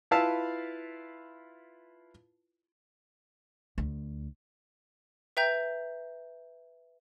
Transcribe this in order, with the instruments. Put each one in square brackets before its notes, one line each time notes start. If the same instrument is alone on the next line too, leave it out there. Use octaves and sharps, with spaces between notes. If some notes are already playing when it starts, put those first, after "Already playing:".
[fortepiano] E4 F4 B4 F5 A5 E6
[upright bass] D2
[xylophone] B4 E5 G5 A#5 G6